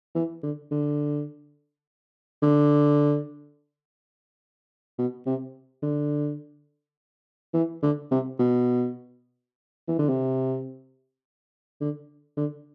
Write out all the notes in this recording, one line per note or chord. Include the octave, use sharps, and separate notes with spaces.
E3
D3
D3
D3
B2
C3
D3
E3
D3
C3
B2
E3
D3
C3
D3
D3